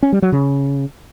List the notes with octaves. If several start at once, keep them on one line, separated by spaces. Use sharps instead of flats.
C#4
G3
F#3
C#3